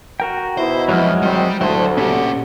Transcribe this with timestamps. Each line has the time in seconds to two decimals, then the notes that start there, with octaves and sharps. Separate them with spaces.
0.20 F#4 A#4 G5
0.58 B2 D#4 E4 C5
0.89 F2 F#3 G#3 F6
1.22 G#1 D#3 G3 C4
1.61 D2 F#3 E4 A4 C5 C6
1.97 A#2 C#4 F#4 G4